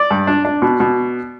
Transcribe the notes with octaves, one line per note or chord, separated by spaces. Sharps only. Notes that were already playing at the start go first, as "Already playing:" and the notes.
Already playing: D5
G2
D4
D4
B2
B2